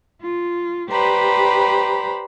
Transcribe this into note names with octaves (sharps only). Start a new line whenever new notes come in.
F4
G4 B4 C5 D5 A#5 B5